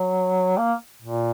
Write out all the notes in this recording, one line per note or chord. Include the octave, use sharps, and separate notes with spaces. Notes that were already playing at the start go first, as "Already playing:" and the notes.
Already playing: F#3
A#3
A#2